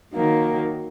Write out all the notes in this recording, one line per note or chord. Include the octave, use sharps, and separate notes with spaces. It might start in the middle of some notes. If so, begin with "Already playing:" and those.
D#3 F#3 A#3